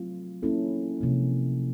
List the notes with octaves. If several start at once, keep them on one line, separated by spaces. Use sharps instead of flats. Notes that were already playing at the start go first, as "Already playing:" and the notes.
Already playing: F#3 A3 C4 F4
A#3 C#4 E4 A4
C3 F3 A#3